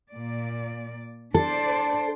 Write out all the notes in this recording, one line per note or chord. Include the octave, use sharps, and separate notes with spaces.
A#2 D5
D4 A4 C5 D5